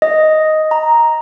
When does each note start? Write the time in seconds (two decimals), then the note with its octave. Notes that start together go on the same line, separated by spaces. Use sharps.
0.02 D#5
0.71 A#5